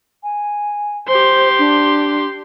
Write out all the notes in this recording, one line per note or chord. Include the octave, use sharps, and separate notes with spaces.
G#5
G4 C5 C6
D4